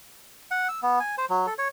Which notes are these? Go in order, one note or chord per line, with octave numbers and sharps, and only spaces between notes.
F#5
E6
B3
G#5
C5
F#3
A4
C#5